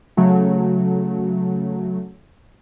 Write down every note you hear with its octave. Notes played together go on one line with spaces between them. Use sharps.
C#3 F#3 A3